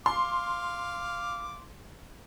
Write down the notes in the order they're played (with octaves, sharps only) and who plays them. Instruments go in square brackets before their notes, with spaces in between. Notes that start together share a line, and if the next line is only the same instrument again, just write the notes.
[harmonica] F5 D6 [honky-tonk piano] C6